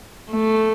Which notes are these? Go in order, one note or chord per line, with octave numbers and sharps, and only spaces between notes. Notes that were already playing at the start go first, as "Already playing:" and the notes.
A3